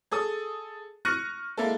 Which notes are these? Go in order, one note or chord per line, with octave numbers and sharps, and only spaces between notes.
G#4 A4 D#6
C#6 F6 F#6 A#6 C#7 D#7
G#3 A#3 E4 A4